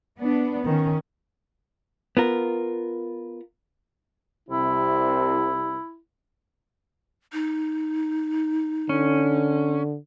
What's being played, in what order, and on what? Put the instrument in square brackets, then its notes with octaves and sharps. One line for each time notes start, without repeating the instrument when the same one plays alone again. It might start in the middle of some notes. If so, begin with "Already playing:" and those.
[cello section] B3 D4
[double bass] D#3 [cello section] C#4
[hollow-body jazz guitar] B3 F4 A#4
[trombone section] C2 C3 [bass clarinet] E4
[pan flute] D#4
[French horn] D3 [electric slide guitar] C#4